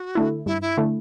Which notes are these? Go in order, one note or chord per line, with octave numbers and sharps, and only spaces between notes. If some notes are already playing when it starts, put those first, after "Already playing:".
Already playing: F#4
D3 A3 E4
G2 E4
E4
D3 A3 E4